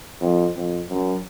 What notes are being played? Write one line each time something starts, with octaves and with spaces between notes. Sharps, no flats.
F2
F2
F#2